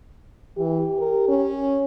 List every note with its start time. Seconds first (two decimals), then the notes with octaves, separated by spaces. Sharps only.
0.58 E3 G4
0.99 A#4
1.28 C#4